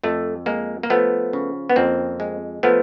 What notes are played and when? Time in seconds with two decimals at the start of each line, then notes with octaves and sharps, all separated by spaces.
0.03 F2 A3
0.46 G#3 A#3
0.83 A#3
0.90 F3 A3 B3
1.33 C#3
1.70 B3
1.76 F2 A#3 C4
2.20 G#3
2.63 F3 A3 B3